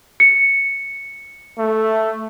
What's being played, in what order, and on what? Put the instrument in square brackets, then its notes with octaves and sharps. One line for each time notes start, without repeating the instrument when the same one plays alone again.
[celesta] C#7
[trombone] A3